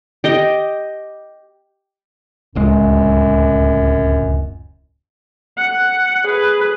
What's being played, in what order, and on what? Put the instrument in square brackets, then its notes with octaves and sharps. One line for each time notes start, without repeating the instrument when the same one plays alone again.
[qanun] G4 D#5
[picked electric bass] D1 C#2 G#3 [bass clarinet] F#2
[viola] F#5
G#4 B4